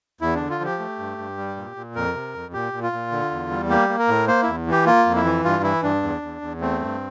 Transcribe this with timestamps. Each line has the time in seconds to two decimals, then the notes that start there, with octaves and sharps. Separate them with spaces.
0.21 E2 E4
0.35 D4
0.40 D3
0.50 F4
0.60 F3 G4
0.79 A3
0.98 G2
1.18 G2
1.37 G3
1.57 A#2
1.76 A#2
1.95 F2 A#4
2.14 C3
2.34 F2
2.53 A#2 G4
2.73 A#2
2.83 F4
2.93 A#2
3.12 D3
3.31 E2
3.51 G3
3.70 A#3 G4
3.89 A#3
3.99 A#4
4.08 A2
4.28 A#3 C5
4.43 E2 E4
4.67 E3 G4
4.86 A#3 F4
5.06 F2
5.15 E4
5.25 E3
5.44 G2 F4
5.64 E3 E4
5.83 G2 D4
6.03 E2
6.22 E2
6.41 E2
6.61 A3 C4
6.80 G2